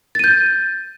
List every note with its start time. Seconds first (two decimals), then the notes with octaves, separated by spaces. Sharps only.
0.15 A6
0.19 D#7
0.24 G6